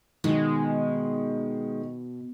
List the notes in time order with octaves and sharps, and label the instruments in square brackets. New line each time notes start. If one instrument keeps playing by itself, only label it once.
[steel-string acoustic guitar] B2 [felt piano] D#3 [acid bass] G#3